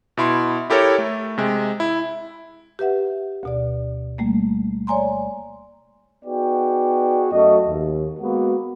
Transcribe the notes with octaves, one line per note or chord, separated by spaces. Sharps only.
B2 E4 C6
E4 G4 A4 A#4 C#5
A3
C3 G#3
E4
G4 B4 E5 F#5
D2 B2 D5
G3 A3 A#3
C#5 D5 G#5 A#5 C6
B3 D#4 F#4 G#4 D5 G5
F#2 A3 F#4 D#5
D#2
G#3 A#3 B3 F#4